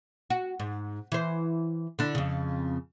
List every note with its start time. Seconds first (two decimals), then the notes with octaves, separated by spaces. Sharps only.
0.30 F#4
0.59 G#2
1.12 E3 C5
1.99 D3 D4 E4
2.15 F2 C#3